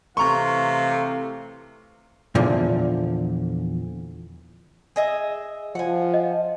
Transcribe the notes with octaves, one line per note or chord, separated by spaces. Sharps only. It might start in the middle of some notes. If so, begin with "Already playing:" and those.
C3 E3 A3 F5 A#5 C6 C#6
E2 A#2 D3 F3
G#4 D#5 E5
F3 F#5 G#5
D#5